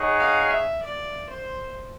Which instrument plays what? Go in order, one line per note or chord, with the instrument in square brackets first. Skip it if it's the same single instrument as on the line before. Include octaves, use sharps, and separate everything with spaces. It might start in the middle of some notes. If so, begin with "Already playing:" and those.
Already playing: [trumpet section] D#4 G#4 C#5 F#5
[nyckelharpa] F5
E5
D5
C5